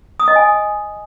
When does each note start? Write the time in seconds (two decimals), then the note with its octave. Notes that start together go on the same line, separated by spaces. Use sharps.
0.20 D#6
0.28 D#5
0.36 G#5